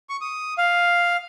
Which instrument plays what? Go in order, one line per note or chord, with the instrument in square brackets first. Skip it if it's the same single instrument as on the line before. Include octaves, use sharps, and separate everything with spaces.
[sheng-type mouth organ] C#6
D#6
F5